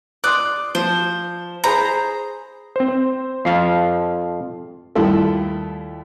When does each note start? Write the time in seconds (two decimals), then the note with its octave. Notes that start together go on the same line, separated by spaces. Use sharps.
0.24 D5 C6 D#6 F#6
0.75 F3 C5
1.64 G#4 C5 A#5 B5
2.76 C4 C5
2.88 C5
3.45 F2 F3 F5 C7
4.95 D#2 G3 A3 E4 F4 A4